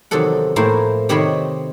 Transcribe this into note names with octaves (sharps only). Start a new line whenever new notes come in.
E2 C3 D#3 F#3 A4 F#5
A2 F3 A#3 E4 C5 A#5
C3 D#3 C4 C#5 D#5 B5